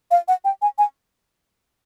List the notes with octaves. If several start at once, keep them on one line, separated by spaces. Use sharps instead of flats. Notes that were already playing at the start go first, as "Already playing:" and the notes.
F5
F#5
G5
G#5
G#5